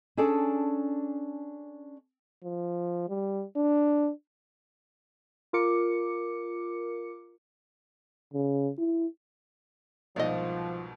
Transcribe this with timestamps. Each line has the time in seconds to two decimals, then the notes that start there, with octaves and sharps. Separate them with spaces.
0.17 C#4 D4 G#4 A4 D5 A5
2.44 F3
3.09 G3
3.57 D4
5.53 F4 A#4 D6 C#7
8.34 C#3
8.79 E4
10.16 C2 G#2 B2 F3 D5 D#5